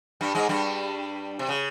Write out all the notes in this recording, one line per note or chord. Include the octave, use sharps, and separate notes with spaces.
G2 G3
G#2 G#3
G2 G3
C3
C#3